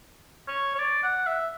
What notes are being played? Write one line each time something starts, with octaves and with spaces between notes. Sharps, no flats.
C#5
C#5
D5
F#5
E5